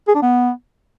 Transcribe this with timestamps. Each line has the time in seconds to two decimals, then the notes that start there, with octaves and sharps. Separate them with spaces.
0.07 G#4
0.15 D4
0.22 B3